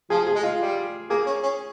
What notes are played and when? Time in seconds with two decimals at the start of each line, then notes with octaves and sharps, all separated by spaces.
0.10 F3 G#4
0.27 G#4
0.35 G#3
0.43 F4
0.59 G3
1.10 A#3 G#4
1.26 C#4
1.43 C#4